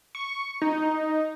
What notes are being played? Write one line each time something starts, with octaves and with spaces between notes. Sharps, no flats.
C#6
D#4